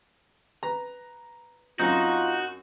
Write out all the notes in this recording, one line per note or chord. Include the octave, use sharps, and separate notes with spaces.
B4 A#5
F#2 C4 D#4 F4 F#4